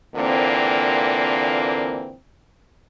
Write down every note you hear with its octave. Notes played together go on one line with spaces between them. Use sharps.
A#2 D3 E3 A#3 C4